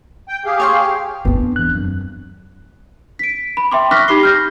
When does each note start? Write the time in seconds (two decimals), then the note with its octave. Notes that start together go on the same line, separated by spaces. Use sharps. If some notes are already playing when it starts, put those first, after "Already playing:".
0.28 G5
0.45 G4 G#4 F5
0.60 C#5 G5 C6
1.25 B3 C4 D4
1.56 E2 F#6
1.75 F#2
3.19 B6 D7
3.57 B5
3.71 E5 G5 C6 D6
3.91 C#6 D6 F6 F#6 A#6 B6
4.08 D#4 G4 B5 D6 C7 G7
4.23 F6 G6 A#6